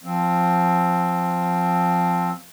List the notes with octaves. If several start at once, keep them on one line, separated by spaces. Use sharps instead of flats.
F3 C4